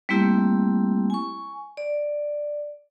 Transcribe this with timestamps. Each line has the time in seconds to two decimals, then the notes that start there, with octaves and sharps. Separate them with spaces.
0.09 G3 A3 A#3 C4 E4 G4
1.10 G#5 C#6
1.77 D5